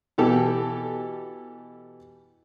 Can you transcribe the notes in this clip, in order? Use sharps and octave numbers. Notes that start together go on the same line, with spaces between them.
B2 E3 G4 A4